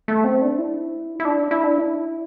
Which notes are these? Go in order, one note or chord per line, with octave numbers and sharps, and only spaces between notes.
A3
C4
D4
E4
E4
D4
E4
D4
E4